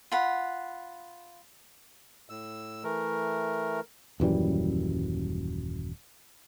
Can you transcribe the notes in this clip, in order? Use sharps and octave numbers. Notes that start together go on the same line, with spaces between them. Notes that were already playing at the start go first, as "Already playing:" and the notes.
F4 F#5 B5
A2 E6
E3 A3 A#4
D#1 F#2 E3 G3